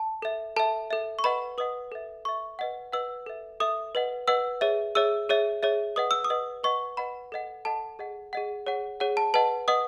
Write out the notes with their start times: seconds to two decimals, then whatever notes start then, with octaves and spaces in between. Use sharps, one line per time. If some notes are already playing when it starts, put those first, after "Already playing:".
Already playing: A5
0.22 A4 E5
0.56 A4 E5 A5
0.91 A4 E5
1.19 C#6
1.24 B4 D#5 F#5 B5
1.58 B4 D#5 F#5 D#6
1.92 A4 E5
2.25 A4 E5 C#6
2.59 B4 D#5 F#5
2.92 B4 D#5 F#5 E6
3.26 A4 E5
3.60 A4 E5 D#6
3.95 B4 D#5 F#5
4.28 B4 D#5 F#5 E6
4.61 G#4 C#5 E5
4.95 G#4 C#5 E5 E6
5.29 G#4 C#5 E5
5.63 G#4 C#5 E5
5.96 B4 D#5 F#5 D#6
6.11 E6
6.24 D#6
6.30 B4 D#5 F#5
6.64 B4 D#5 F#5 C#6
6.97 B4 D#5 F#5 B5
7.32 A4 D#5 F#5
7.65 A4 D#5 F#5 A5
7.99 G#4 D#5 F#5
8.33 G#4 D#5 F#5
8.67 G#4 C#5 F#5
9.00 G#4 C#5 F#5
9.17 A5
9.34 B4 D#5 F#5 A5
9.68 B4 D#5 F#5 D#6